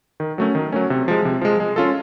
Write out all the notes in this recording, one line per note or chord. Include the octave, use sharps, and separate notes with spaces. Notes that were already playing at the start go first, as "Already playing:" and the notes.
D#3
F#3 A3 C#4
D#3
F#3 A3 C#4
C3
F3 G#3
C3
F3 G#3
G#3
C#4 F4 A4